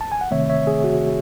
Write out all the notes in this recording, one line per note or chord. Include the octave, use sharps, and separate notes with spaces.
A5
G#5
F#5
C3 D#3 A3 C4 C#5 E5
C#5 E5
G#4
F#4